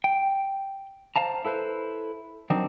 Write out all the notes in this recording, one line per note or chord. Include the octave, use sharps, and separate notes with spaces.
G5
C5 F5 A5 A#5
E4 A4 B4 C5
D#3 F#3 C4 D4 D#4